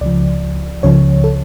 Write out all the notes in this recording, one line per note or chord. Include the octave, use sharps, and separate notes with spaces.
C#2 C#3 F3 D5
C#2 C#3 F3 C#5
A4